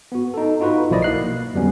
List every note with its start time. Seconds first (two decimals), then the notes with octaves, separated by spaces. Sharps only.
0.12 B3 F#4
0.34 D#4 A4
0.60 D#4 F4 F#4 B4
0.90 B1 F3 A#3 E4 D5 D#5
1.02 A#3 F#6 C7
1.54 F2 D3 F#3 G3 B3 C#4